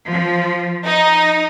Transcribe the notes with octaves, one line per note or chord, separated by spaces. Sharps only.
F3
D#4